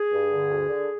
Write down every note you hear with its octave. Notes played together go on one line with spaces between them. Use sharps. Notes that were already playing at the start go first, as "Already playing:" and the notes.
Already playing: G#4
G2
D3
D2
D3